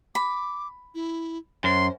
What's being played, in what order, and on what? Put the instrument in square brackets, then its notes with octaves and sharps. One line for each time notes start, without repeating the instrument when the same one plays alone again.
[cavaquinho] B5 [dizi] D6
[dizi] E4
[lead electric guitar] F#2 [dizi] C5 [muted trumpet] C6